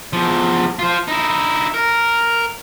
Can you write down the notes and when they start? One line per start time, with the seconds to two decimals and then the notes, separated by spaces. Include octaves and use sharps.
0.13 E2 F3
0.79 F4 C5
1.08 D#4 E4
1.74 A#4